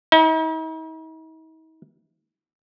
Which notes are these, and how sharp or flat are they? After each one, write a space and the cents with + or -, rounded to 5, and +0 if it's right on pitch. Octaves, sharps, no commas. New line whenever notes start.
D#4 +45